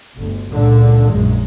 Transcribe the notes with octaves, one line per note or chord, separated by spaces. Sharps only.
G1 D2
C#2 A#2 D3
A#1 F#2 G#3